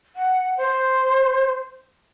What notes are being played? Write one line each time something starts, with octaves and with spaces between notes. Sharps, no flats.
F#5
C5